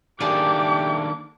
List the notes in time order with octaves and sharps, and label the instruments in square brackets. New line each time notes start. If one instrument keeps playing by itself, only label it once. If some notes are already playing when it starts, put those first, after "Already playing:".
[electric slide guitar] D#3 A#3 D4 [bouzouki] A3 G#4 A5 [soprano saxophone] G4 [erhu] D6